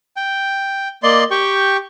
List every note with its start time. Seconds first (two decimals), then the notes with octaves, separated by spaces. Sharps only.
0.17 G5
1.03 A#3 D5 D#5 C6
1.31 G4 G5 C#6